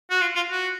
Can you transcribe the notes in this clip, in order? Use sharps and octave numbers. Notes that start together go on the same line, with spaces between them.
F#4
F4
F4
F#4